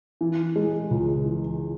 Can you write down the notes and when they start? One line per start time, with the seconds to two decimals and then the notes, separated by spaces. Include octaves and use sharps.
0.21 E3
0.56 G#3
0.91 C#2
1.25 E3